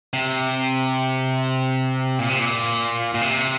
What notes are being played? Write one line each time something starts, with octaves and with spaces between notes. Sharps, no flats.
C3
A#2
C3
A#2
A#2
C3